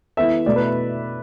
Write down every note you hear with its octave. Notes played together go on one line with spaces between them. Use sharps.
E3 B3 E4 A4 E5
B2 A3 E4 D5
B4